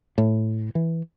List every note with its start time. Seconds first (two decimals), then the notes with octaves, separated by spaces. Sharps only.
0.18 A2
0.75 E3